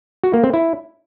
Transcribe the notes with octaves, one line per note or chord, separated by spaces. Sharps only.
F#4
A#3
C4
E4